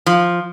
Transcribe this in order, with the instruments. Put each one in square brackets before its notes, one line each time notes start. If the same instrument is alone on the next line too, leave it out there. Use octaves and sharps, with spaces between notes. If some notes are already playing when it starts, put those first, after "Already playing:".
[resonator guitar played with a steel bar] F3